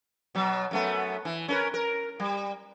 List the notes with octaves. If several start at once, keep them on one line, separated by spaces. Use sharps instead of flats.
B2 F#3
F#2 A3 B3
E3
C#4 A#4 B4
A#4
G3